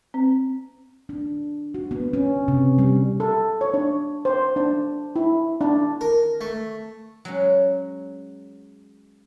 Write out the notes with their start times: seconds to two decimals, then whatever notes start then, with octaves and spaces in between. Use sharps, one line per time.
0.14 C4
1.09 D4
1.74 F#4
1.91 B3
2.13 C#4
2.48 C3
2.78 G3
3.20 A4
3.61 C#5
3.74 D4
4.25 C5
4.56 D4
5.16 E4
5.61 D4
6.01 A#4
6.41 A3
7.25 F#3 G#3 C#4